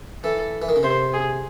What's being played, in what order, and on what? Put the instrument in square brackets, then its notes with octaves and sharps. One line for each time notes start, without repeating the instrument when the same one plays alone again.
[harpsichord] E3 [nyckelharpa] A4
[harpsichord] E3
D#3
C#3
[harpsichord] C3 [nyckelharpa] C5
[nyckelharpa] G#4